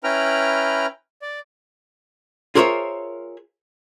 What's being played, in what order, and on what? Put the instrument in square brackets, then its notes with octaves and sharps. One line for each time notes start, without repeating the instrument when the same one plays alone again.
[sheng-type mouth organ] C#4 E4 B4 G5 A#5 F6
D5
[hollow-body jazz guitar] F4 G#4 A#4 C5 C#5 E5